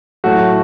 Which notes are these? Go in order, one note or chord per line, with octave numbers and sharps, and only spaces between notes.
A2 F#3 A3 F#4